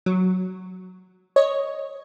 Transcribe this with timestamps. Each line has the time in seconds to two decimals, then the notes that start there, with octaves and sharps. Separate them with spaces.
0.06 F#3
1.36 C#5 D#5